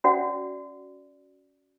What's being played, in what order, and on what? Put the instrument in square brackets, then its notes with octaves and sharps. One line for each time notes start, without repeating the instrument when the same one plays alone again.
[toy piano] C#4 F#4 D5 E5 F#5